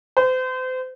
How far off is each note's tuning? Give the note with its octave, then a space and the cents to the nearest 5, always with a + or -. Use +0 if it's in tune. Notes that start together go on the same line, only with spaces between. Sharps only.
C5 -35